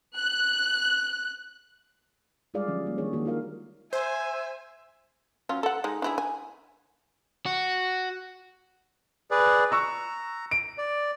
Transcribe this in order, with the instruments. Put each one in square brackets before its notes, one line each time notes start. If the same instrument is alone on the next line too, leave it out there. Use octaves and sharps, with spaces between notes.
[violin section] F#6
[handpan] G3 G#3 F4 G#4 D5 F5
D3 F3 F#3 C#4
G3 A#3
D#3 G3 D4 G#4 C#5
D#3 G#3 A#3 F#4 A4
F4 A#4 F5
[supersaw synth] C5 [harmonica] E5 [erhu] G#5
[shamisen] F#3 C#4 F4
A4 F#5
G#3 D#4
D4 E4 G#4
G#5
[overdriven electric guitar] F#4
[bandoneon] G#4 B4 D5
[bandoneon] A#5 [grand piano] C#6 E6 F#6
[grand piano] D7
[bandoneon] D5